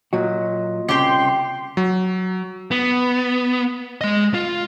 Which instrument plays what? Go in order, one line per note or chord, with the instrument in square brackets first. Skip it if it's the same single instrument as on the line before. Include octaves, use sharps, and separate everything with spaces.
[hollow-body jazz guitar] A#2 F#3 F#4 [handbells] F4 D#5
[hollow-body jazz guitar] C2 C#3 [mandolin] G4 G5 [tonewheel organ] C6
[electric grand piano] F#3
[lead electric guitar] B3
G#3 D#5
F4